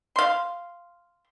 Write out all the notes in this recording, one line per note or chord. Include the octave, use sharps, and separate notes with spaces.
F5 C6